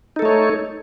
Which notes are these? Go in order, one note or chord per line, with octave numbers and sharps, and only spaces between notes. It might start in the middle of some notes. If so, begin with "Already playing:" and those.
A3 D#4 A4 C#5